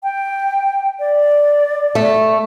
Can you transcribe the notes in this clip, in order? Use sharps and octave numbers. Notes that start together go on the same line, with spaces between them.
G5
D5
A3